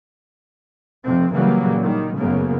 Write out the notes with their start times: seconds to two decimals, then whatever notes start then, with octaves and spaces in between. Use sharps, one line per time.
1.04 F1 F2 C3 C4
1.34 A#2 C#3 E3 F#3 G3 A#3
1.83 D#3 G3
2.18 F#1 F#2 A2 C#3 A#3 B3